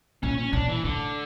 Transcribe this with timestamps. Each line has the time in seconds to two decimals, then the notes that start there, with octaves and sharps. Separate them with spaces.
0.23 A#2 C#4
0.38 C#4
0.53 A#2 D4
0.69 E3
0.84 A2 D3